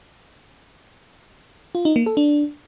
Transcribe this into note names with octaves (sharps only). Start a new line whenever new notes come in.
F4
D#4
A#3
A4
D4